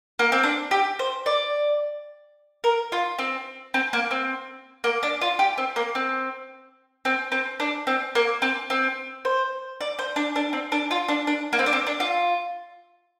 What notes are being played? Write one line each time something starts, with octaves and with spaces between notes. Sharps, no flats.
A#3
C4
D4
G4
C5
D5
A#4
F4
C4
C4
A#3
C4
A#3
D4
F4
G4
C4
A#3
C4
C4
C4
D4
C4
A#3
C4
C4
C5
D5
C5
D4
D4
C4
D4
F4
D4
D4
A#3
C4
D4
C4
D4
F4